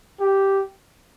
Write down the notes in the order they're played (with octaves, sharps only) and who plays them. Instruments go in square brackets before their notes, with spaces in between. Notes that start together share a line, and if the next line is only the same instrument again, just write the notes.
[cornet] G4